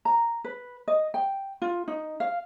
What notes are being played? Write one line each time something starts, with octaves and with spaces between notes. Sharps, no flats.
A#5
B4
D#5
G5
F4
D#4
F5